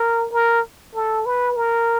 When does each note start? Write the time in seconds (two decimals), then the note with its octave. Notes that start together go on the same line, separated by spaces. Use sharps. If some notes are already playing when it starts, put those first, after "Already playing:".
Already playing: A#4
0.33 A#4
0.95 A4
1.26 B4
1.56 A#4